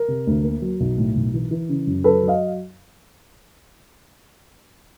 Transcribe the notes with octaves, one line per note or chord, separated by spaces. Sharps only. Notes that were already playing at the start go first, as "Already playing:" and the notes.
Already playing: A#4
C3
D2
A#3
F#3
B1
A2
B1
E3
E3
C#3
F#2
F#3 A4 B4
F#3
D#5 F5